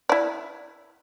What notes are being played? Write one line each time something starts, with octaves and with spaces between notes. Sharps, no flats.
E4 D5